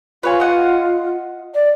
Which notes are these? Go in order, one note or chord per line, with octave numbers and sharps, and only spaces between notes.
F4 B4 C#5 G#5
D#5 F#5
D5